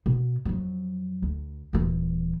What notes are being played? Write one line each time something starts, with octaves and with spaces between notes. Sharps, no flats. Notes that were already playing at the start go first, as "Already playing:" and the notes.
B2
F2 F#3
D2
D#1 E3